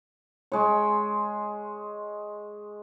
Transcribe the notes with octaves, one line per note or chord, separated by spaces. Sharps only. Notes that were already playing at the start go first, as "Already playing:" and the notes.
G#3 C#5